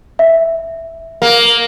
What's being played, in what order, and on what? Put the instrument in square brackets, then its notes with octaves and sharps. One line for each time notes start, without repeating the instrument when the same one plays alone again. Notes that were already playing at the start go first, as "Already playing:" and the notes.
[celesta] E5
[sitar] A#3